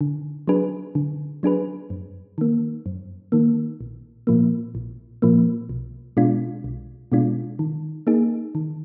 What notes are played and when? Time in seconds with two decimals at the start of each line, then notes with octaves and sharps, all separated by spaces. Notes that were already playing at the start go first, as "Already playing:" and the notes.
0.01 D3
0.48 F#3 D4 G#4 B4
0.95 D3
1.43 F#3 D4 G#4 B4
1.90 F#2
2.38 D#3 A#3
2.86 F#2
3.32 D#3 A#3
3.81 A#1
4.27 A#2 F3 A#3
4.75 A#1
5.22 A#2 F3 A#3
5.69 B1
6.17 B2 G#3 D4 F4
6.64 B1
7.12 B2 G#3 D4 F4
7.59 D#3
8.07 A#3 D#4 G#4
8.55 D#3